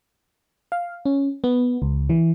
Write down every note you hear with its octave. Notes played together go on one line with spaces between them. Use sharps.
F5
C#4
B3
C#2
E3